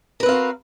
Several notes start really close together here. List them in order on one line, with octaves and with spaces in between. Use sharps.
A#4 B4 C4 F5 F#4